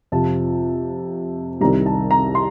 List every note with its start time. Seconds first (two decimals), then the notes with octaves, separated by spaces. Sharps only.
0.12 F2 C3 F3 A5
1.61 C2 C3 D#3 G3 A#5
1.86 A5
2.11 A#5
2.35 C6